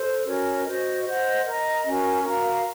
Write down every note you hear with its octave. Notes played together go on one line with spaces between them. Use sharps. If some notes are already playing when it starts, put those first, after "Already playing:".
Already playing: A4 C5
C#4 F#4 A#4 C#5
F#4 C5 D#5
C5 D#5 F#5
A#4 D#5 A#5
C#4 F#4 A#4
F#4 A#4 F5 A#5